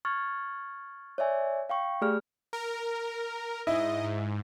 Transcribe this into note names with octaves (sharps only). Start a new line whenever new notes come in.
C#6 F6 G#6 A6
C#5 D5 E5 G#5
F5 G5 C#6
A3 G4 G#4 D5 F6
A#4
G#2 E4 D#5
G#2